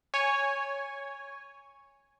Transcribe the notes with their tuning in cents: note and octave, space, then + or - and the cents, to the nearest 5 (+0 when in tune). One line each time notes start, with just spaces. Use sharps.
C#5 +0 G#5 -10